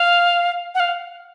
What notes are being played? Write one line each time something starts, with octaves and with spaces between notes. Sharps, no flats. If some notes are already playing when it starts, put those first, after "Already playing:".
Already playing: F5
F#5
F5